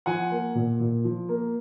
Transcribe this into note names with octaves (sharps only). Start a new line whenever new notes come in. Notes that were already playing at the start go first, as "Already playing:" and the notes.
F3 F#5 G#5
A#3
A#2
A#2
F3
A#3